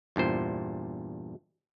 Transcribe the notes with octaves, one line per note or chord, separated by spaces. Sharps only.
E2 G2 A#2 C5